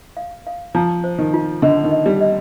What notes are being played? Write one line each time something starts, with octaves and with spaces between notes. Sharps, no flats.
F5
F5
F3 A#5
C5
D#3
F4
D3 D#5
D#3
D#5
G3
D#5